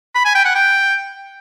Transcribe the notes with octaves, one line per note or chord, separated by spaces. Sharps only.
B5
G#5
G5
F#5
G5